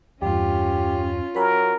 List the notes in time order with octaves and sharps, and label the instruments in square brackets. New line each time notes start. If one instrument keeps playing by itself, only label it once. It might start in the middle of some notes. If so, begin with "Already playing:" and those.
[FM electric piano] E2 G2 [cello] C#4 F4 [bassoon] G4
[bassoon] F#3 [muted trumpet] A#4 [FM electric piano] G#5 B5